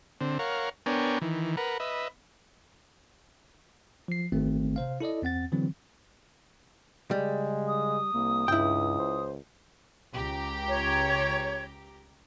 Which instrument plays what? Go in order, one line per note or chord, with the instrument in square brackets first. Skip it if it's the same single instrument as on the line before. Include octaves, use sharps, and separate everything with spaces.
[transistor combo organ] D3 C4
A#4 C#5 F5 F#5
B3 D4 A#4 C#5 G5 G#5
D#3 E3
A#4 B4 F#5
B4 D#5 E5
[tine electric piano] F3 C7
G#1 D#3 A3 C4
C3 C5 F5
E4 A4 D5 D#5
E2 C4 F#5 A6
D3 E3 F#3 C4
[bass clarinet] C#3 [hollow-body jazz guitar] G3 [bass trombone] G#3
[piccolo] D#6
[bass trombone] C2 [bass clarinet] A#3
[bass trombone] C#2 [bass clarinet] G2 [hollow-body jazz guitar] E4 G5
[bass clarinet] C5
[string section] C#2 G4 A#5
[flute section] C#5